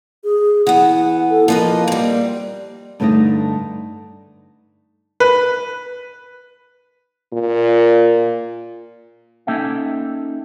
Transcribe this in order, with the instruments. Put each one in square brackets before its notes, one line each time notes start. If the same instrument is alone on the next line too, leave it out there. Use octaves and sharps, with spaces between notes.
[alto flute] G#4
[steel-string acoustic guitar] E3 B3 [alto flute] F#5
[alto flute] A4
[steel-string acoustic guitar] F3 B4 D#5 [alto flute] A#3
[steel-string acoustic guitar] G3 C4
[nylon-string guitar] G2 D3 A3 D4 D#4 D#5
[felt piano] B4
[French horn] A#2
[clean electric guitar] A#3 C#4 D#4 A4 E5 G5